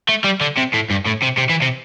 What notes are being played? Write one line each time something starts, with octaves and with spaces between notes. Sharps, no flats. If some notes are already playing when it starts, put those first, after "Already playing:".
A3
G3
D3
C3
A2
G2
A2
C3
C3
E3
C3